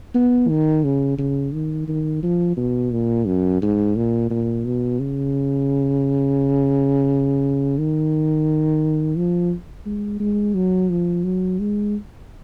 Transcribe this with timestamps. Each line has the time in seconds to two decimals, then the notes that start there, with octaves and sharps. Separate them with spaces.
0.14 B3
0.49 D#3
0.84 C#3
1.18 C#3
1.53 D#3
1.88 D#3
2.23 F3
2.57 B2
2.91 A#2
3.27 F#2
3.62 G#2
3.96 A#2
4.30 A#2
4.65 B2
4.99 C#3
7.78 D#3
9.17 F3
9.86 G#3
10.20 G#3
10.54 F#3
10.90 F3
11.24 F#3
11.60 G#3